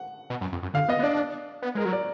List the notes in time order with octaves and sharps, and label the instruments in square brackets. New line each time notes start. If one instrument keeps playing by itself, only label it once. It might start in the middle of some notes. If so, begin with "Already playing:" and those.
Already playing: [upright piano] F#5
[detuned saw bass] B2
F#2
F2
F#2
[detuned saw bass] D3 [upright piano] F5
[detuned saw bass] B3 [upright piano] D#5
[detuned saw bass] B3
[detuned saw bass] D4 [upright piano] D5
[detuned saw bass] B3
[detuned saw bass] G#3 [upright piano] A#4
[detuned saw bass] F#3
[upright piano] D5